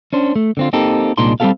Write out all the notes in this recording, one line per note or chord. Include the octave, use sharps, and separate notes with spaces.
C#4 D4 C5
A3
D3 C4 F4
A#3 C4 D#4 G4 A4
C2 A#2 G#3 D4 D#4 C6
G3 C4 C#4 G4 A4 F5